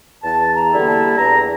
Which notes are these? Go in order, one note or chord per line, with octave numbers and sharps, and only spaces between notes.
E2 A5
A#5
D3 G3 A#3 E4
A5
E2 A#5